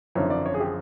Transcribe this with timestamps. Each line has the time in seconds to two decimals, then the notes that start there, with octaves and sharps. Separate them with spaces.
0.15 G#1 F#2 D3 F3 C#5
0.30 D5
0.46 C#5
0.54 G#4
0.60 G4
0.65 G#4